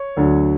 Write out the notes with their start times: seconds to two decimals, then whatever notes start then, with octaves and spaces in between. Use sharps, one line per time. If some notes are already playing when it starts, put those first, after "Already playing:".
Already playing: C#5
0.17 D2 D3 F#3